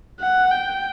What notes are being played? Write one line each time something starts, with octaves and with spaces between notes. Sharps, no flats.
F#5
G5